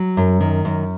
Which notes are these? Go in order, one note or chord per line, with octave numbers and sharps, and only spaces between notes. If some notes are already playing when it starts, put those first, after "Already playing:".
Already playing: F#3
F#2
D#3
F#2